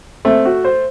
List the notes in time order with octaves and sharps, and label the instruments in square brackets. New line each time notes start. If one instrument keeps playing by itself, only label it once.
[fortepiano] A3 [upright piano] C4
[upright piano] F#4
C5